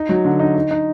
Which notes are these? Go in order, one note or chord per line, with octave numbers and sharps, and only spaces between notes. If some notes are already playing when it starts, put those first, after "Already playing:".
Already playing: D#4
F#3
D3
D#4
D#4
D#4